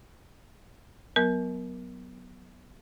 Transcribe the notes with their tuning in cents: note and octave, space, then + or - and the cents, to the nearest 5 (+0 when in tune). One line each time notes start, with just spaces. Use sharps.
F#3 +0 B3 +0 A#4 +10